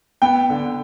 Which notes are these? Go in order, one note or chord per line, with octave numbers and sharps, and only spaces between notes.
B3 G5
D3